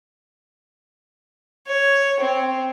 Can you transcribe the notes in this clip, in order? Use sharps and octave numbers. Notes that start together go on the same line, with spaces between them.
C#5
C4